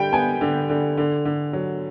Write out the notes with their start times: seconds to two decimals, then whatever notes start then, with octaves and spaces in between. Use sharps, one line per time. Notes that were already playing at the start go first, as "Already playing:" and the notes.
Already playing: D3 G3 G5
0.13 B3 G#5
0.41 D3
0.70 D3
0.97 D3
1.25 D3
1.53 F#3